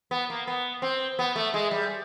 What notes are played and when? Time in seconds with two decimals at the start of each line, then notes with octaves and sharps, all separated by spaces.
0.11 B3
0.30 A#3
0.47 B3
0.82 C4
1.19 B3
1.36 A3
1.54 G#3
1.71 G3